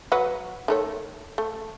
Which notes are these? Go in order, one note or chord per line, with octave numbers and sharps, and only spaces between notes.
F#3 F#4 B4
D#3 A3 C#5
A3